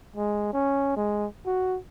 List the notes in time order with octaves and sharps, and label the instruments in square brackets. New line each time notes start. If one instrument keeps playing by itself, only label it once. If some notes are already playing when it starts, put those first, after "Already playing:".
[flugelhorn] G#3
C#4
G#3
F#4